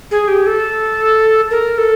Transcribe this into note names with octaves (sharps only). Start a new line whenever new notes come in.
G#4
G4
A4
A#4
A4